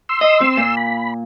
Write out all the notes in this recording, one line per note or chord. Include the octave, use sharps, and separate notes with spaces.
C6 E6
D#5
C4
A#2
B5